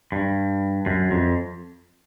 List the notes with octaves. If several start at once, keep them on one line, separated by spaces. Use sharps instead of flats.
G2
F#2
F2